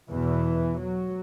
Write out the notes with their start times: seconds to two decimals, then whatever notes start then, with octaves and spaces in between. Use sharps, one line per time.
0.11 E2 B2 E3
0.79 F#3